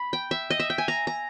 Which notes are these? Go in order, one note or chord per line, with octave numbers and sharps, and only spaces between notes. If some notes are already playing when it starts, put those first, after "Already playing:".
Already playing: B5
G5
E5
D#5
E5
G5
G#5
A#5
A#5